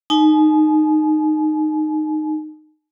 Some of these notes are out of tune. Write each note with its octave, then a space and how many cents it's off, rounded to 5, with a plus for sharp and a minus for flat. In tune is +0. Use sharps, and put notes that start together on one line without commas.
D#4 -15 G#5 +40